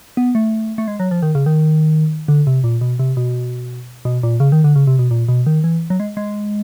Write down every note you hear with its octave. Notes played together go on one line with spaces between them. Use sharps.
B3
A3
A3
G#3
F#3
F3
D#3
C#3
D#3
D3
C3
A#2
B2
C3
B2
B2
A#2
C#3
D#3
D3
C#3
C3
B2
A#2
B2
D#3
E3
F#3
G#3
G#3